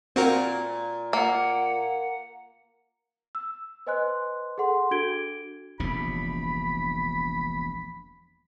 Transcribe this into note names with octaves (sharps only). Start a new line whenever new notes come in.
A#2 C4 F#4 A#4
A#3 F#5
E6
B4 C5 D#5 G#5 C6 F#6
G#4 A4 F#5 C6
D4 F#4 A4 G#6 D7 G7
E1 A#1 C3 B5